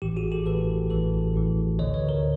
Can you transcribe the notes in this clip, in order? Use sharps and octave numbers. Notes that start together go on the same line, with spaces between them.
A1 A2 E3 G4
F#4 G#4
G4 A4
A1 A2 E3 A4 B4
A1 A2 E3 A4 B4
A1 A2 E3
D2 D3 C#5 D#5
B4 C#5
A#4 C5